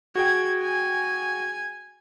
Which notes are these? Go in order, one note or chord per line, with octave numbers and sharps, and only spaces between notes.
F#4 G#4 G5 G#6
G#5